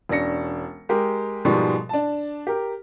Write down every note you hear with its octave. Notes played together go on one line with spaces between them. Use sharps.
E1 C#4 D4 A#6 C#7
G#3 G4 A#4
G#2 B2 F3 G3 G#3 A#3
D4 A5
G4 A#4